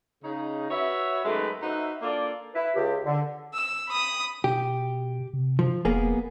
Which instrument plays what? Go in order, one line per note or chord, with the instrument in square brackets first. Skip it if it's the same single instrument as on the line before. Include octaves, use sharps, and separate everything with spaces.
[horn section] C#3 D#4
F#4 B4 C#5 E5
F#2 D#3 G#3 A3 D#4 B4
D#4 F#4 B4 C5 E5
A#3 D4 F4 A4 D5
[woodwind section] E4 B4
C#2 G4
D3
[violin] E6
B5 D#6
[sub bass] B2 [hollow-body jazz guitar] G4
[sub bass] C3
[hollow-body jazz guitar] F3
[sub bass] E1 [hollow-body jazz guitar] A#3 B3 G#4